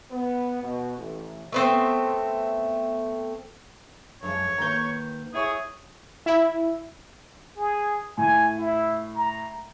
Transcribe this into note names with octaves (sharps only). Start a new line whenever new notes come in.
B3
B2
A1
A3 B3 C4
F#2 F3 G#3 C#5
D#3 A#3 B4 A#5 G6
E4 G#4 C#5 C#6
E4
G#4
A2 G#5
E4
A#5